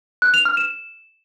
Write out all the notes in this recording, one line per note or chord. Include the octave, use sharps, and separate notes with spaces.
F#6
F7
F6
E7